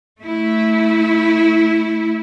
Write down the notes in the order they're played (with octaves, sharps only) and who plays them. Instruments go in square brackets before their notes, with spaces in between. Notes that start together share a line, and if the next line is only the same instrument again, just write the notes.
[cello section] A3 E4